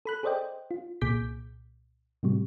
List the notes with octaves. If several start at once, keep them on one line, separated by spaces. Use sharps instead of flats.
A4 B5 F#6
G#4 A4 C5 D5 D#5 G5
F4
C2 A#2 G#4 D6 G6 B6
A2 C3 F#3 G3